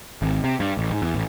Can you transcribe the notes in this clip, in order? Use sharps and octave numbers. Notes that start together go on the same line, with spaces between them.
G#1
C3
G2
A1
G#2
E2
A1